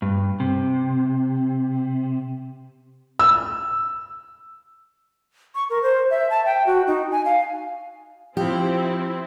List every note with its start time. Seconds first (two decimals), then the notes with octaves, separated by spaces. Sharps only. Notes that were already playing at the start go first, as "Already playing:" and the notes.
0.02 G2
0.40 C3
3.19 E6
5.55 C#6
5.70 A#4
5.83 C5
6.10 E5
6.30 A5
6.45 G5
6.66 F#4
6.87 D#4
7.11 G#5
7.25 F5
8.37 F3 C4 E4 G4